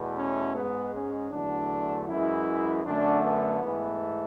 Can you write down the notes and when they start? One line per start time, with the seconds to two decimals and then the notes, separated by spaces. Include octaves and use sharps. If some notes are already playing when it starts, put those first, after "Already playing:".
Already playing: E2 B2 A3
0.17 C#4
0.55 G#2 G#3 B3
0.93 C#4
1.31 E2 D3 F#3 A3 D4
2.08 F#2 E3 G#3 E4
2.84 F#2 D3 A3 D4
3.23 B3
3.61 G#2 E3 A3